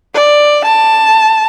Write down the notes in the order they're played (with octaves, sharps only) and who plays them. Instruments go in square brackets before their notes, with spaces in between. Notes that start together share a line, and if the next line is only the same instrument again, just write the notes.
[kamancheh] D5
A5